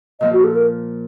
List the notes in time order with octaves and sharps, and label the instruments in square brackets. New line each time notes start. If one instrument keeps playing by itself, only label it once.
[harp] A#2 F3 A#3 [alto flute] D#5
[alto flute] F#4
A4
A#4